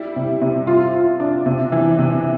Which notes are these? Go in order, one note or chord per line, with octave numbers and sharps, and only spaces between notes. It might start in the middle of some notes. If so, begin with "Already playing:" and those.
Already playing: G3 E4
C3
C3
F4
F4
D4
C3
E3
C3